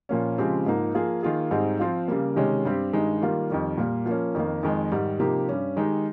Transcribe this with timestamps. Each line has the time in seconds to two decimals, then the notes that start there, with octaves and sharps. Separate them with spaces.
0.09 A#2 F3 A#3 C#4
0.38 C#3 F3 G#3 C4 G4
0.66 G#2 F3 A#3 D#4
0.95 F3 A#3 F4 G#4
1.23 D#3 A#3 F4 G#4
1.51 G#2 G3 C4 D#4 G#4
1.80 F3 C4 F4
2.08 C#3 G3 A#3
2.36 C3 D#3 G#3 C#4 G4
2.65 G2 G3 C4 G4
2.93 G2 D#3 G#3 D#4
3.22 D#3 G3 A#3 F4
3.50 F2 D#3 G3
3.78 A#2 G3 A#3
4.06 F3 A#3 C#4
4.35 F2 D#3 A#3
4.63 F2 D#3 G#3
4.92 G#2 D#3 G3
5.19 C3 F3 A#3 D#4 G4
5.48 G2 G3 C#4 G4
5.76 D#3 G#3 D#4 G4